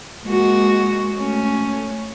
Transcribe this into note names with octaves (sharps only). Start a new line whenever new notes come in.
G#3 A#3 F#4
A3 C#4